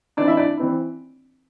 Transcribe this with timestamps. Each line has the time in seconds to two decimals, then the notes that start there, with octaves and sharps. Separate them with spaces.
0.17 E3 C4 D4 E4 D5
0.28 E4 E5
0.37 D4 D5
0.57 E3 C4 E4